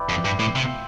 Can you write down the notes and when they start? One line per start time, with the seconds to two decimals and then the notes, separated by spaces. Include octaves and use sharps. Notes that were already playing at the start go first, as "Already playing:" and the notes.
Already playing: E4 B4 D5 G5
0.09 F2
0.25 G2
0.39 A2
0.55 C3 F4 C5 E5 G5